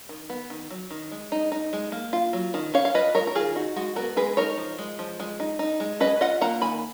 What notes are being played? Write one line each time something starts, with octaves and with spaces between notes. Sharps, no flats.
D#3
B3
D#3
F#3
D#3
G#3
D#4
D#4
G#3
A#3
F4
F#3
D#3
C#4 C#5 F5
F5
F4 B4 D#5
G#3 A#4 C#5
A#4
D#3 F4 G#4
D#4 F#4
G#3 F#4
B3 F#4 A#4
G#3 G#4 B4
D#4 A#4 C#5
F3
G#3
F3
G#3
D#4
D#4
G#3
C#4 B4 D#5
F4 D#5 F#5
A#3 F#5 A#5
D#3 G#5 B5